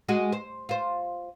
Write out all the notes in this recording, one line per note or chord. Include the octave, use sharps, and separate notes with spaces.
G#3 F#4 G#4
C5
F4 C5